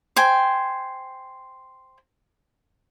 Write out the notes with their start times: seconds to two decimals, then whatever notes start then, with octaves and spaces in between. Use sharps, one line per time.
0.16 C5 G5 G#5